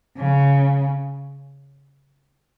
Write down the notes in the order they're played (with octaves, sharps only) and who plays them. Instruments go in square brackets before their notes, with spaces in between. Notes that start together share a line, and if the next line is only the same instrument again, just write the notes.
[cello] C#3